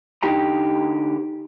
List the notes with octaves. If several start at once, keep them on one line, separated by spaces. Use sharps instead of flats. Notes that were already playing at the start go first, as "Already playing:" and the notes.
D3 D#4 G4 G5 A#5